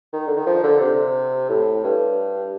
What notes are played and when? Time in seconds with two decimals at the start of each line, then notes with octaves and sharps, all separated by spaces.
0.13 D#3
0.27 D3
0.36 D#3
0.47 F3
0.64 D3
0.81 C3
1.49 A2
1.84 G2